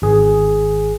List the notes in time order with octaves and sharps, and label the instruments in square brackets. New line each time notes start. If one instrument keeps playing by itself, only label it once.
[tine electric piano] G#1 G#4